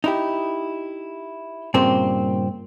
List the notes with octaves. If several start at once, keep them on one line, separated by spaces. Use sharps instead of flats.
D#4 E4 G4
G2 A#2 C#3 A#3 C4